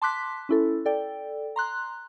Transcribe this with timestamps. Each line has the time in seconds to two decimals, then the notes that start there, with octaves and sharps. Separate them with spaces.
0.02 A5 C6 D6 F#6 B6
0.49 C#4 E4 A4
0.85 A4 D5 G5
1.56 A#5 C6 F#6